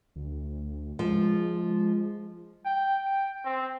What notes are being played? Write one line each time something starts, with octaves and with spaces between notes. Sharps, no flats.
D2
F3 G#3
G5
G5
C4